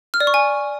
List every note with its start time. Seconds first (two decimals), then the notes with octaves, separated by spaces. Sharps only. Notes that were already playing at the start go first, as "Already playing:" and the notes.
0.14 F6
0.20 D5
0.27 C#6
0.34 G#5